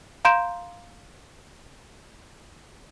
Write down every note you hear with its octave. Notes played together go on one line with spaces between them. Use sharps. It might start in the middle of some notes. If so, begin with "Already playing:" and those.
F5 A#5 C6 G6 D7 E7